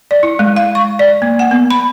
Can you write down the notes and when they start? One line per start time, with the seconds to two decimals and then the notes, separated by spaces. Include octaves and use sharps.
0.11 D5
0.23 E4
0.39 G#3
0.56 F5
0.75 C#6
0.99 D5
1.22 A#3
1.39 F#5
1.51 B3
1.71 B5